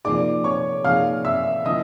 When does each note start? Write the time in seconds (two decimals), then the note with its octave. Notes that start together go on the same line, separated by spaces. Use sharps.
0.05 C3 F3 A#3 D#4 G#4 D5 D6
0.44 C#5 C#6
0.85 C3 F3 A#3 D#4 G#4 F5 F6
1.25 E5 E6
1.65 D3 F3 A#3 C#4 E4 D#5 D#6